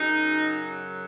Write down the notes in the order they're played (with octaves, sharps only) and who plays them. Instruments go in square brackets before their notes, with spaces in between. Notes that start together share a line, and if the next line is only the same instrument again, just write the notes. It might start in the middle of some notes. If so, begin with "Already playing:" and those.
Already playing: [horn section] F#2 C#3 F#3 D#4